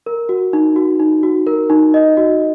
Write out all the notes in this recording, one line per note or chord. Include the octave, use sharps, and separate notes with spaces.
A#4
F#4
D#4
F#4
D#4
F#4
A#4
D#4
D#5
F#4